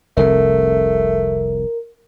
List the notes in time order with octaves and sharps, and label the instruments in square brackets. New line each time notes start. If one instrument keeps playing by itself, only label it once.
[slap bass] F1 C2 C3 [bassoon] A3 [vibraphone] A#4